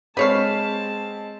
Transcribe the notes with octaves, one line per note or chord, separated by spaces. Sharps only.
G#3 C4 B4 C#5 F5 A5